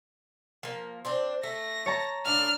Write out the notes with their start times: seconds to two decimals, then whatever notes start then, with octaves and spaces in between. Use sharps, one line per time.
0.63 F3 A#3
1.05 C4 D4 C5
1.43 A3 A#6
1.86 C#5 A5 A#5
2.26 A2 A#3 D4 F6